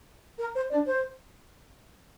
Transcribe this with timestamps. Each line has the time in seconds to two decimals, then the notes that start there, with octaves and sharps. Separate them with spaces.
0.39 A#4
0.55 C5
0.70 D4 D5
0.86 C5